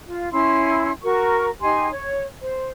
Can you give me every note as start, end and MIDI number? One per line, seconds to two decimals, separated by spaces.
0.06 0.29 65
0.31 0.91 61
0.31 0.91 64
0.31 0.91 84
1.03 1.49 66
1.03 1.49 70
1.03 1.49 85
1.61 1.89 63
1.61 1.89 67
1.61 1.89 80
1.61 1.89 84
1.90 2.23 73
2.42 2.72 72